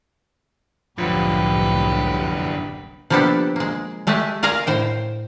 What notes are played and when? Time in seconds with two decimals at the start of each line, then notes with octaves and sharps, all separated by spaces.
0.98 F1 C2 F#2 A2 D3 F3 G4 B4
3.10 F3 A#3 B3 D4 G4 A4
3.56 G#3 A#3
4.07 G#3 A3 G4 D#5 E5
4.43 A#4 D5 D#5 F5 G#5 A#5
4.67 A2 C5 G5